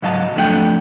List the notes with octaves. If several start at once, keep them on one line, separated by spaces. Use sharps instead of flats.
C#2 G#2 F#3 D#5 F5 A5
F2 A3 D4 D#4 F#5 G5